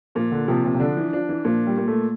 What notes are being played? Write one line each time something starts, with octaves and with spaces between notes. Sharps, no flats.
A#2 F3
D3
C3 F3
C3
C3
D3 D4
E3
F3 D4
E3
A#2 F3
G3
A#2
A3